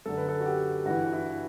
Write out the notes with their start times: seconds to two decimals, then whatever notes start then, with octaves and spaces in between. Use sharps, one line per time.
0.06 F#2 D3 A4
0.17 B4
0.29 A4
0.40 F#4
0.46 G4
0.85 G2 E3 F#4
1.13 E4